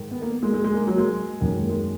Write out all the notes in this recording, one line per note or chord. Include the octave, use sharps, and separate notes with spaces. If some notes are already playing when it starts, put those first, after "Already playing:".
Already playing: G#2 D#3
B3
A#3
G#3
G#3
G#3
A#3
F#3
G#3
F#2 D#3 A#3
G#3
G#3